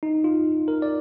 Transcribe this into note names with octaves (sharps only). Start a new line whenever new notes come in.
D#4
F4
A#4
D5